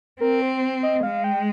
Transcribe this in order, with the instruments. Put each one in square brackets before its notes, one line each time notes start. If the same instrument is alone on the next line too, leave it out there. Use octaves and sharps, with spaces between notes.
[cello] C4 [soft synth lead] A#4
[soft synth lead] C5
D#5
[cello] G#3 [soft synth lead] F5
[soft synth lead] G5